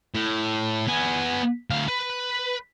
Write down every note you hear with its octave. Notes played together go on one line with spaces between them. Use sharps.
A2
B3 G#5
D2 F5
B4